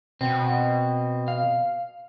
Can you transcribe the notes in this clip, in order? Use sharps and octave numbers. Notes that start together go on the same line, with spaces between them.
B2 C4
F5